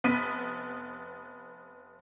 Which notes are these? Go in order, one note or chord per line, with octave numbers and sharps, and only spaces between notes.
F1 B3 B6 D#7